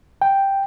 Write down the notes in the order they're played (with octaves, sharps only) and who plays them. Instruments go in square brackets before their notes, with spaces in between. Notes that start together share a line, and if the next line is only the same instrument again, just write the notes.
[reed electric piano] G5